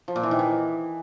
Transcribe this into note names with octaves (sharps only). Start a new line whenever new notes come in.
F3
A#2
E3
D#3
E3